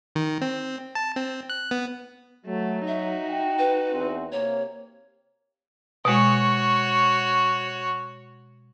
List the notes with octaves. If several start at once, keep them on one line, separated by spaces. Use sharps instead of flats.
D#3
C4
A5
C4
F#6
B3
F#3 A3
D#4 F#4 E5
G5
B4
E2 C4
C3 A#3 C#5
B2 G#3 F#4 C#5